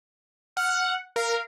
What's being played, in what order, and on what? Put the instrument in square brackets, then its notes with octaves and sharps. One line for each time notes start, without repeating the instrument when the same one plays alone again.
[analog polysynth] F#5 [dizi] F6
[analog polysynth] A#4 [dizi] F5